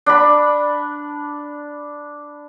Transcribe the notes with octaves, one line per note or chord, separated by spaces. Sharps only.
D4 B5